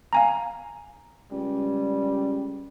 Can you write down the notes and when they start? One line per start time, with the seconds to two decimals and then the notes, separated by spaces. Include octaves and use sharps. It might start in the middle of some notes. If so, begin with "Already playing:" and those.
0.13 F5 G#5 A#5
1.32 C#2 G3